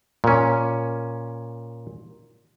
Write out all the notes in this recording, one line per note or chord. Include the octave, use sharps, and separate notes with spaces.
A#2 C#4